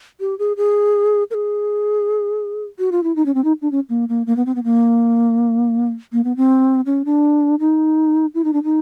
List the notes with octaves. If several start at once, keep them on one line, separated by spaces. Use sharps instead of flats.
G4
G#4
G#4
A#4
G#4
F#4
F4
E4
D#4
C#4
C4
D#4
D4
C#4
A#3
A#3
A#3
B3
C4
B3
A#3
A#3
B3
C4
C#4
D4
D#4
E4
D#4
D4
D#4